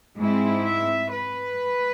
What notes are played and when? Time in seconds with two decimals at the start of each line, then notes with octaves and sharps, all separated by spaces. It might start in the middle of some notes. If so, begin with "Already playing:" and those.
0.18 G#2 G#3 C4 E4
0.64 E5
1.11 B4